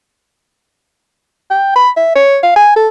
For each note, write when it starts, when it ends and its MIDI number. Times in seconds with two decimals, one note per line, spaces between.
1.51 1.75 79
1.76 1.90 83
1.97 2.12 76
2.16 2.38 73
2.43 2.52 77
2.56 2.72 80
2.76 2.88 69